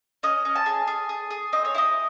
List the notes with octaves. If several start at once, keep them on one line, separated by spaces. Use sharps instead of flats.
C#4 D#5
C#4
A5
G#4
G#4
G#4
G#4
C4 D#5
C#5
E4 D#5